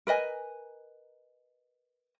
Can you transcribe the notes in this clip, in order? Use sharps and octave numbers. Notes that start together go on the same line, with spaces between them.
A#4 B4 D#5 G#5